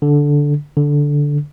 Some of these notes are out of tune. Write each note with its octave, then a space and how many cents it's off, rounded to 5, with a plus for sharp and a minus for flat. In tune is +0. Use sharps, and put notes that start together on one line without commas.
D3 -10
D3 -10